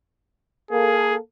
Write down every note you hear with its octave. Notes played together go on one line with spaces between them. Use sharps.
A#3 G#4 A4